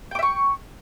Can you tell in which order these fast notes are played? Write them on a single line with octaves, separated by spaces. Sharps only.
G5 D6 E5 C#6